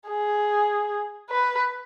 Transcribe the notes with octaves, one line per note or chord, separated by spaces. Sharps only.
G#4
B4